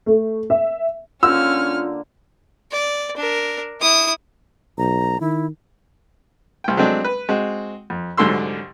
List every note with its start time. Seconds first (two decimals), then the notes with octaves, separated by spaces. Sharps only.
0.06 A3
0.50 E5
1.23 D3 A#3 C#4 F4 E6 F6
2.72 D5
3.17 D4 A#4
3.80 E4 D#6
4.78 B1 A#5
5.21 D#3 E4
6.64 C2 G5
6.77 F#3 G#3 A3 C4 D4
7.04 B4
7.29 G#3 C4 F#4
7.90 F2
8.17 C2 G#2 D3 F#3 C6 E6